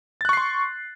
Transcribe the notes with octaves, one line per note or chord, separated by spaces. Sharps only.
C6 C#6 F#6 A6 C7